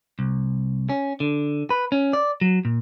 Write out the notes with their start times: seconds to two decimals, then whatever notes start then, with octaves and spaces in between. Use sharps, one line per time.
0.19 C2
0.89 C#4
1.20 D3
1.70 B4
1.92 C#4
2.13 D5
2.41 F#3
2.65 A#2